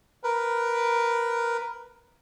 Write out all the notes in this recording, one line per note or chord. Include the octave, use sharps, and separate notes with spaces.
A#4 B4